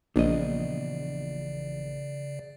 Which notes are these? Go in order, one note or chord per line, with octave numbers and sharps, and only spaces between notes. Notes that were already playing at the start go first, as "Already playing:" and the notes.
A#1 E2 C#3 D5 D#5